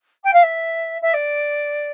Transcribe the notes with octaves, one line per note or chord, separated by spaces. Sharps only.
G5
F5
E5
E5
D5